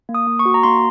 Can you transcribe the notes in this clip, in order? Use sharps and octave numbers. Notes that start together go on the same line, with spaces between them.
A#3
D#6
A#3
C#6
F#4
A#5
A#3 C6